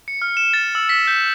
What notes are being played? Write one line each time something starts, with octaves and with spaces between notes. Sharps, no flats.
C#7
F6
E7
A6
E6
B6
G6